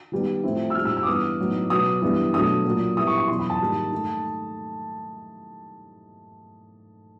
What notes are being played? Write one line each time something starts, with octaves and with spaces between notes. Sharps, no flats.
D#3 G3 B3
A2 F3 A3 C4 E4
E6
A#2 G3 C4 D#4 F6
E6
E6
D6
G2 E3 G#3 B3 D#6
A2 F#3 B3 D#4
B2 F#3 B3 D#6
G2 E3 G3 B3
B2 F#3 A3 D4 D#6
A#2 F#3 A#3
A#2 G3 B3 E4 D#6
C#6
C#6
E2 B2 F#3 C6
B5
A5
G#2 D#3 G3 A#3 D#4
A3 D#4